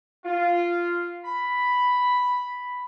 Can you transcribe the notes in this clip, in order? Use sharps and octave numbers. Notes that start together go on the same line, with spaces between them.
F4
B5